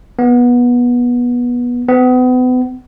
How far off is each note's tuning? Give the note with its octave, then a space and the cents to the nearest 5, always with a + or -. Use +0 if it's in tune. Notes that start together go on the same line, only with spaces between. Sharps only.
B3 -20
B3 +35